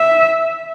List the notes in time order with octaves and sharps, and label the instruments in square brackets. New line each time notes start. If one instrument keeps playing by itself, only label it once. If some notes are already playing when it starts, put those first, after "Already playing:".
Already playing: [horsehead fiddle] E5